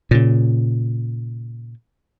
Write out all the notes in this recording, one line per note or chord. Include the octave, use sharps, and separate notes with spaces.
A#2 C#3